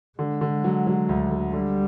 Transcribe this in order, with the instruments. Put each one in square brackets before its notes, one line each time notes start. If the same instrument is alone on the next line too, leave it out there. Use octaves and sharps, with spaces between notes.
[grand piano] D3 [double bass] G#3
[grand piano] D3
F#3
F#3
D2
D3
[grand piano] D3 [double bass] G3